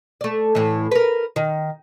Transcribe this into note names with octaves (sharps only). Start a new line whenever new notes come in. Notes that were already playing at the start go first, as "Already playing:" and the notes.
A3 D5
A2 E3
A#4 B4
D#3